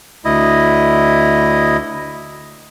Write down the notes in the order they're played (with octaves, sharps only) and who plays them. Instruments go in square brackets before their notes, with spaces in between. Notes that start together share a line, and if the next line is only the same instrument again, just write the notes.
[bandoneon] D2 E4 D#5